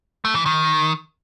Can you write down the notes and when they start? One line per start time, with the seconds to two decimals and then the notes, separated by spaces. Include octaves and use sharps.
0.25 A3
0.35 E3
0.46 D#3